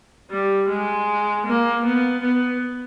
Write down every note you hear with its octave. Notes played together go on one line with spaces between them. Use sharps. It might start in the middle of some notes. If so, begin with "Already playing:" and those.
G3
G#3
A#3
B3
B3